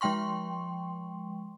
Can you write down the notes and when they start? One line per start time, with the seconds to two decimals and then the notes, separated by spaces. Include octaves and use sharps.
0.01 F3 G#3 G5 C6 C#6